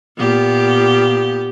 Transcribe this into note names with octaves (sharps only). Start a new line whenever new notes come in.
A#2 B3 G4